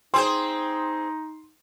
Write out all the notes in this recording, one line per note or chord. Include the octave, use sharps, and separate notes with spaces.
C4 D#4 G#4 C5 C6